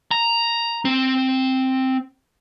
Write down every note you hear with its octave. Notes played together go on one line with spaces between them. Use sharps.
A#5
C4